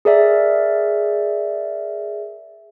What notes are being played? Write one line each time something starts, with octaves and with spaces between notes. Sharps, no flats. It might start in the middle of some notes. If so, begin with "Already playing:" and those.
G#4 A#4 D5 E5